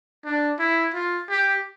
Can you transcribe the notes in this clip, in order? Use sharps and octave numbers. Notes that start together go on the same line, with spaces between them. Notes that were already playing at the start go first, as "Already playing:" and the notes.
D4
E4
F4
G4